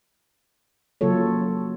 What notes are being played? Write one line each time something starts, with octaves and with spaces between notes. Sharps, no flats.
C#3 F#3 A#3 F4 A4 C#5